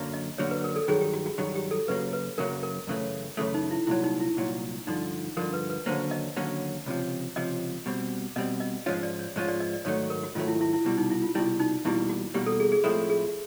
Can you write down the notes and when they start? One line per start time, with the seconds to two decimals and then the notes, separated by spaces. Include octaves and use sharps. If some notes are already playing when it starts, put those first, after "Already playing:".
Already playing: F#2 D3 F#3 A#3
0.13 D#5
0.38 F#2 D3 F#3 A#3 C#5
0.51 B4
0.64 A#4
0.76 A4
0.88 G2 D#3 F#3 G#4
1.01 G4
1.13 F#4
1.26 F#4
1.38 G2 D#3 F#3 F#4
1.55 G4
1.71 A4
1.88 F#2 C#3 F#3 A#3 B4
2.13 B4
2.38 F#2 C#3 F#3 A#3 A#4
2.63 A#4
2.87 F#2 C#3 E3 A3
3.37 F#2 C#3 E3 A3 A4
3.54 D#4
3.71 E4
3.87 C2 A#2 F#3 E4
4.03 D#4
4.20 E4
4.37 C2 A#2 F#3
4.87 G2 D3 F3 D#4
5.37 G2 D3 F3 A#4
5.53 B4
5.70 B4
5.86 D#2 D3 F#3 A#3 C#4 C5
6.11 D#5
6.37 D#2 D3 F#3 A#3 C#4
6.86 C#2 C3 F3
7.36 C#2 C3 F3 D#5
7.86 B2 G3 C4
8.36 B2 G3 C4 D#5
8.60 D#5
8.86 G#2 F3 G#3 C#4 F4 C#5
9.03 D5
9.19 C#5
9.36 G#2 F3 G#3 C#4 F4 C#5
9.48 D5
9.60 D#5
9.74 D5
9.85 G#2 D#3 F#3 A3 C#5
10.10 A#4
10.23 F#4
10.35 G#2 D#3 F#3 A3 F4
10.48 E4
10.61 E4
10.73 E4
10.85 C2 B2 G3 E4
10.98 D#4
11.10 E4
11.22 F4
11.35 C2 B2 G3 E4
11.59 D#4
11.85 E2 B2 G3 A#3 E4
12.09 F#4
12.34 E2 B2 G3 A#3 G4
12.46 A4
12.60 G#4
12.72 G#4
12.84 A2 F3 G#3 C4 E4 A4
13.10 G#4